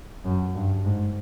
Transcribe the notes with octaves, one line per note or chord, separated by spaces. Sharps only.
F#2
G2
G#2